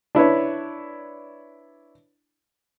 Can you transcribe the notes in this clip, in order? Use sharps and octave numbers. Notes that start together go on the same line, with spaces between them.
D4 E4 B4 C#5